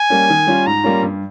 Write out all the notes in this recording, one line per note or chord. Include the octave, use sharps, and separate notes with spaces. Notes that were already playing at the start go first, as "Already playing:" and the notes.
Already playing: G#5
G3 A#3 C#4
D#3
G3 C#4 F4
G#2 A#5
G3 A#3 C#4 F4
G2